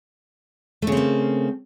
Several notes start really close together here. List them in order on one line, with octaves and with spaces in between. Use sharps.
A3 C#3 C4 A#3